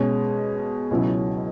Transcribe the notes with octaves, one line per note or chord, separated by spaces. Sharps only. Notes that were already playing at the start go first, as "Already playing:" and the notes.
Already playing: B2 G#3 C#4
C#2 B2 F#3 C#4 E4